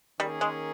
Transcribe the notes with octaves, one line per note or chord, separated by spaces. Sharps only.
D#3 G3 A#3 C#4 G#4
G#3